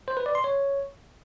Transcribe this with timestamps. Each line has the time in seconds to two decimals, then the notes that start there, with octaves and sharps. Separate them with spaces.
0.08 C5
0.17 B4
0.26 D5
0.35 C6
0.44 C#5